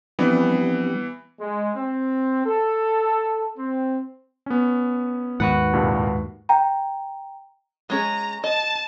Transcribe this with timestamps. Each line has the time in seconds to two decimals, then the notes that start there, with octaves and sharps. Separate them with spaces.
0.19 E3 F3 G3 B3 C4 D4
1.38 G#3
1.75 C4
2.45 A4
3.56 C4
4.46 B3 C#4
5.40 D#2 G#2 D#3 F#4 B4 F#5
5.73 C2 G2 A#2
6.49 G5 A#5
7.90 G#3 C#4 G#4 A#5
8.44 D#5 A5